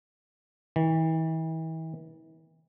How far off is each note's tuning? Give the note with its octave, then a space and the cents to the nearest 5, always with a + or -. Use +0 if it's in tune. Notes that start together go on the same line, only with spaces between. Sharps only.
E3 -40